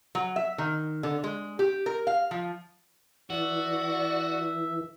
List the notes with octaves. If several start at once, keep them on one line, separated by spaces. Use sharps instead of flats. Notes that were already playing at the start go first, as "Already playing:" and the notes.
F#3
E5
D#3
D3
G#3
G4
A#4
F5
F3
E3 F#4 D5 E5